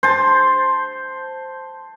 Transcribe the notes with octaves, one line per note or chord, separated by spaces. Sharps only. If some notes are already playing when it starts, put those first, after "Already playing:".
C5 A5